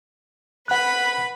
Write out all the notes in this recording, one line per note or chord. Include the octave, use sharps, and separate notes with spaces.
B4 F#5 B5 F#6